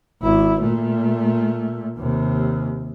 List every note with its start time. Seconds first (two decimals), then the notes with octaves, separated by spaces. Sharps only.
0.22 G#1 E4
0.61 A#2 A3
1.98 D#2 C3